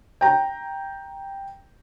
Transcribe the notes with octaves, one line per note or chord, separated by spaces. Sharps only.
G5 A#5